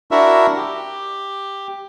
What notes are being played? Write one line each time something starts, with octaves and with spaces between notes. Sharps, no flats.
D4 E4 F#4 A#4 E5
G4